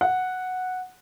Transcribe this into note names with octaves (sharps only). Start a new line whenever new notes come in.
F#5